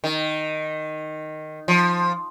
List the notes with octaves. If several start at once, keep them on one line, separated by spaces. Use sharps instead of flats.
D#3
F3